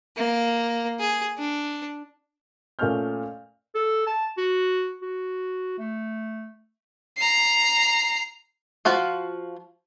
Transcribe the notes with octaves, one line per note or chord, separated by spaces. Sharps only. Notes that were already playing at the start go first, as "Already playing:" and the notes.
A#3
G#4
D4
A#2 A3 C#4 D#5 F6 G6
A4
A5
F#4
F#4
A3
A#5 C7
F3 F4 F#4 F5